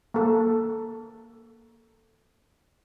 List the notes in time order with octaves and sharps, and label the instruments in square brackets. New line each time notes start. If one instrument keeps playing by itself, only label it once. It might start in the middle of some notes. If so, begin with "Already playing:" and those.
[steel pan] A#3 A4